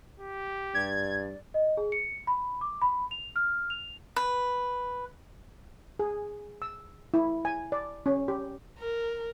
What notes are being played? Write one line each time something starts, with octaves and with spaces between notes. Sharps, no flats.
G4
G2 D5 G#6
D#5
G#4
C#7
B5
D6
B5
F7
F6
F7
B4
G#4
E6
E4
G#5
D5
C#4
G4
A#4